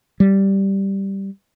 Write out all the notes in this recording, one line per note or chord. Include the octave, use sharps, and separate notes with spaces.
G3